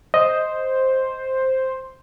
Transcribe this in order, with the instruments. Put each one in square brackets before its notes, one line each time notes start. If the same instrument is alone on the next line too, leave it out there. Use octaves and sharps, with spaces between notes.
[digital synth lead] C5 [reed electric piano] D#5